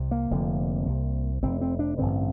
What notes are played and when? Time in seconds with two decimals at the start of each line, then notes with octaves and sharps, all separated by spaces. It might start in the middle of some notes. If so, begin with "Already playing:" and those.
Already playing: C2 C3
0.11 A#3
0.31 F1 F2 D3
0.87 C2 C3
1.42 F1 F2 C3 C4
1.61 C4
1.79 D4
1.98 A1 G2 D3 C4